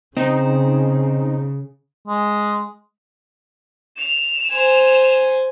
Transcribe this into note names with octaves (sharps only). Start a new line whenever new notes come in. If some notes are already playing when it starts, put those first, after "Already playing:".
C#3 C4 D#4
G#3
E7 F7
C5 G#5